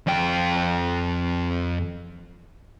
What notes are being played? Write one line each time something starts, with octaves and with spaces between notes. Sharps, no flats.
F2 G5